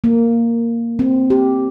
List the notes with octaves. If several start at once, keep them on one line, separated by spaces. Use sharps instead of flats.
A#3
C4
G4